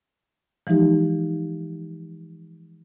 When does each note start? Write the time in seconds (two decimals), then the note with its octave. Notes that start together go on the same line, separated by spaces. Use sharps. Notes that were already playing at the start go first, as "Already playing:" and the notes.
0.67 E3 F3 G#3 D#4 G4